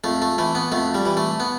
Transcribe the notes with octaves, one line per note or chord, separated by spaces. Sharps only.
F2 A3
A3
E3 A3
B3
F2 A3
G3
E3
A3
B3